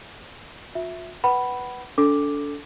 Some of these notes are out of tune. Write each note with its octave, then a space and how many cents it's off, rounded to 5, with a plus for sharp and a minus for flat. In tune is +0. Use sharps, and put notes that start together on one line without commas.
F4 +45 E5 +0
B4 +0 F#5 +25 B5 +0
D4 -35 A4 +0 D6 +0